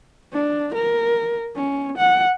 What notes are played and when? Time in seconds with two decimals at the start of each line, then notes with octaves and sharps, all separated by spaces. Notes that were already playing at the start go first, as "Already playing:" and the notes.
0.33 D4
0.74 A#4
1.56 C#4
1.98 F#5